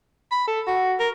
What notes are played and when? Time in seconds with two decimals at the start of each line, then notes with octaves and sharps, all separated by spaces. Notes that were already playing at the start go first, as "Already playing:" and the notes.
0.31 B5
0.48 A4
0.67 F#4
1.00 A#4